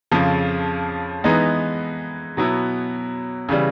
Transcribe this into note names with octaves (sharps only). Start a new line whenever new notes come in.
F2 C#3 F3
E3 G#3 B3 D#4
B2 F#3 B3 E4
C#3 E3 G3